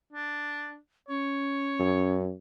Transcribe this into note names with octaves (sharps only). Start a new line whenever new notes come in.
D4
C#4 C#5
F#2